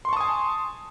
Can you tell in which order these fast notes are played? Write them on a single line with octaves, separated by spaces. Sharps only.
C6 C#6 A5 D#6 G#5